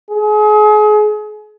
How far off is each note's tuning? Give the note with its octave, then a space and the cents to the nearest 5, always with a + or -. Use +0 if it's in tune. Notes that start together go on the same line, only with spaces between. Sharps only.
G#4 +35